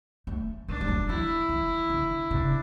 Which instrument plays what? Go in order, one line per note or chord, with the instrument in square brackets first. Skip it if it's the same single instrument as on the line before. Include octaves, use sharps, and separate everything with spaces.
[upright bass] A3
[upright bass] G#3 [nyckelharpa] D4
[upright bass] G#3
F#3
[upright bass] E3 [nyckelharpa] E4
[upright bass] E3
D3
[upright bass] C#3 [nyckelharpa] D4